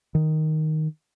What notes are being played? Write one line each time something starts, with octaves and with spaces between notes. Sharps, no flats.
D#3